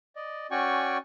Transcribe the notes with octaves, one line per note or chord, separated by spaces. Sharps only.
D5 D#5
C#4 F#4 D5 G5 G#5 C#6